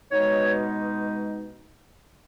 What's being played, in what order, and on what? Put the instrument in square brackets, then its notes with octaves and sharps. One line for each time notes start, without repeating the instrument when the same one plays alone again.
[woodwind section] B2 G#3 D#4 C#5